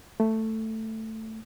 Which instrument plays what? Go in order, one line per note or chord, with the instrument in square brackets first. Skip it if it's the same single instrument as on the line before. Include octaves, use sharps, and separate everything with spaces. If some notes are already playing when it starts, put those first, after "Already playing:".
[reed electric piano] A3